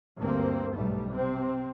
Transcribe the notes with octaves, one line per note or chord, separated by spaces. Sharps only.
D2 G2 A#3 C4
B1 G#2 G3 A3
C3 C4